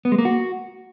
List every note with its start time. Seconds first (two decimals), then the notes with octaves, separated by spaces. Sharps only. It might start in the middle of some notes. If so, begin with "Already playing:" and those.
0.05 B3
0.12 G#3
0.18 A#3
0.25 F#4